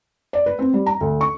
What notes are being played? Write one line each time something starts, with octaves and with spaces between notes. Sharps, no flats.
D5
B4
C4
G3
A#5
D2
C#6